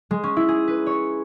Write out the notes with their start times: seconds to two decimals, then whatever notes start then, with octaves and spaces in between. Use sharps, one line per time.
0.11 G#3
0.23 C#4
0.37 E4
0.49 G#4
0.68 B4
0.86 C#5